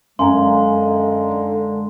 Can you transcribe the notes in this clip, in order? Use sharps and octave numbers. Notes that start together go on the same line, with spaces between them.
F#2 D3 G#3 F5 G#5 A#5 C6